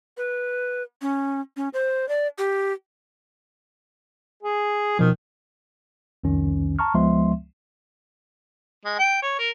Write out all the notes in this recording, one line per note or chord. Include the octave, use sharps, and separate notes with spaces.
B4
C#4
C#4
C5
D5
G4
G#4
B2 D#3 F3
C2 F2 D#3 C#4
A5 A#5 C#6 F6
C#2 F3 G#3 B3 E5 C6
G#3
G5
C#5
A#4